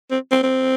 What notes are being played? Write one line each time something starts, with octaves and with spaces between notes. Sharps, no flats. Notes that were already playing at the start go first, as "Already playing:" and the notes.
C4
C4
C4